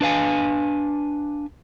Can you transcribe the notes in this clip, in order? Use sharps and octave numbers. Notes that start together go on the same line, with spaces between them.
D4 B4 F5 G#5